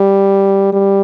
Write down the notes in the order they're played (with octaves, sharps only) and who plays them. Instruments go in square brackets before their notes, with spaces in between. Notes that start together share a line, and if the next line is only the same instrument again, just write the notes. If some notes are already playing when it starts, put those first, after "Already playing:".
Already playing: [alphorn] G3
G3